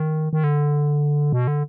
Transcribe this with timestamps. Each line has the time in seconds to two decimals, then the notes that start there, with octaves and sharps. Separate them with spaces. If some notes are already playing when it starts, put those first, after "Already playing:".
Already playing: D#3
0.33 D#3
0.44 D3
1.33 B2
1.47 D3